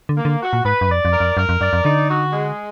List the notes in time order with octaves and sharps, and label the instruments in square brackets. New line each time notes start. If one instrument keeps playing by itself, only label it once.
[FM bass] D3
[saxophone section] A#3
[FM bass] D3
[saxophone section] F#4
[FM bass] A#2
[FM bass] G#2 [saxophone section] B4
[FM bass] F#2
[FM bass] F2 [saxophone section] D5
[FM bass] F2
[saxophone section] A#4
[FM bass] F2
[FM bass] F#2 [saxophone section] A#4
[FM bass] F2
[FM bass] F#2 [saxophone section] D5
[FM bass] F2
[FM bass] D3 [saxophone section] D#4
[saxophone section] F#4
G#3